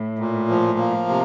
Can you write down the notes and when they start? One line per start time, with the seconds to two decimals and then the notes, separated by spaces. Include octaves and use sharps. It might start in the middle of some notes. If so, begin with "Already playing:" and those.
Already playing: A2
0.19 A#2
0.49 F3
0.79 A#3
1.09 C3